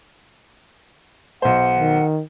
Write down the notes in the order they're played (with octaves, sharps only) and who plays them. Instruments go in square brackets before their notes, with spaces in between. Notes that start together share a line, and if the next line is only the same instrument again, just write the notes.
[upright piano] B1 C5 [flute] F#5
[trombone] D#3